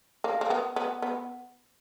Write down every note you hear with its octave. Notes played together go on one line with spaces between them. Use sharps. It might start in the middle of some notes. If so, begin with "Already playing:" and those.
A#3
A#3
B3
B3
B3